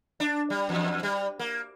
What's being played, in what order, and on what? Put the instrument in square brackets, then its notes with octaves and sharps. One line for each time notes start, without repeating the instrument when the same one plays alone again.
[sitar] D4
G3
E2
G3
A#3